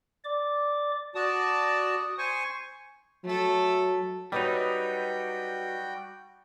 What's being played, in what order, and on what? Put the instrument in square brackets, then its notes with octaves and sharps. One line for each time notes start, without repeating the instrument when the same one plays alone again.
[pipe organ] D5 D6
[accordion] F#4 D5 A5 [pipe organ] D#6
[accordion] C5 G#5 C#6
[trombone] F#3 [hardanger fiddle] A3 A4
[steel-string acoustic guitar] F#3 B4 D#5 [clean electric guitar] G3 D#4 [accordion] F#4 G5